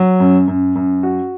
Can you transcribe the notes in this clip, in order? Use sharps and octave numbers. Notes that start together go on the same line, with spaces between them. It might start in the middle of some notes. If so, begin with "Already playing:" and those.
Already playing: F#3
F#2
F#2
F#2
F#4